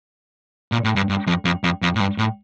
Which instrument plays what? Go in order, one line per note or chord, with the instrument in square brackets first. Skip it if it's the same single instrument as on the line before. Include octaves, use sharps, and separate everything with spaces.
[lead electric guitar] A#2
A2
G2
G2
F2
F2
F2
F2
A2
G2
A2